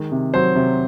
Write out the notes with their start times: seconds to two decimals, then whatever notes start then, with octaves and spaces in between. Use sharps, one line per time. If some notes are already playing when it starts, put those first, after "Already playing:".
Already playing: D#3 G#3
0.12 C3
0.34 F#3 C5
0.56 C3